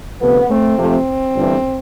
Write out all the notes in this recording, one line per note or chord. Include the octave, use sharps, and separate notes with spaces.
D2 C3 F3 A3 B3
A3 C4
F2 C3 F3 A3
G1 G2 E3